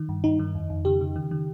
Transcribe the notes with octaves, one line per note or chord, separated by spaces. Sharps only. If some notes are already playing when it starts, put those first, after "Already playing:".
Already playing: D#3
G2
G2 D#4
D#3
F2
F2
C#3 G4
C#3
D#3
D#3